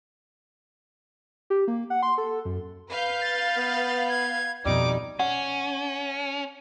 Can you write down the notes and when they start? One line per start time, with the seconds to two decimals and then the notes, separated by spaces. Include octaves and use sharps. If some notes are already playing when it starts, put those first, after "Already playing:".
1.50 G4
1.68 A#3
1.90 F#5
2.03 C6
2.18 A4
2.45 F#2
2.90 B4 F5 G6
3.21 A6
3.57 B3
4.09 G#6
4.65 F2 B2 G3 D#4 D6
5.19 C#4 F#5